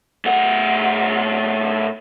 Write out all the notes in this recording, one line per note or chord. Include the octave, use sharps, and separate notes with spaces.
A2 F#5